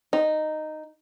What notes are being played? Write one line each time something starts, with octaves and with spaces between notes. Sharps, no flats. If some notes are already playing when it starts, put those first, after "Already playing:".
D#4